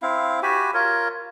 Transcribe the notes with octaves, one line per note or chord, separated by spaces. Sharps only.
C4 E4 F5
F#4 G4 G#5 B5
F4 A#4 C#5